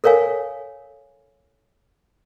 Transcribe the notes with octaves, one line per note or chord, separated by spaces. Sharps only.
A4 A#4 C#5 F5 G#5